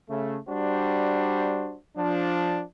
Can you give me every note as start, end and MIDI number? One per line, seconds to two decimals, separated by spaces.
0.10 0.38 49
0.10 0.38 57
0.48 1.76 55
0.48 1.76 62
0.48 1.76 66
0.48 1.76 72
1.97 2.63 53
1.97 2.63 62